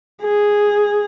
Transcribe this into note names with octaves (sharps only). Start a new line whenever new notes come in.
G#4